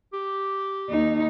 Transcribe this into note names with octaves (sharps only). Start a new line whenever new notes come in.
G4
D#2 D#4